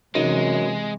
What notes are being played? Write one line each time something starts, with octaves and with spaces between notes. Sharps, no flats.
F#2 C3 E3 G#3 D#4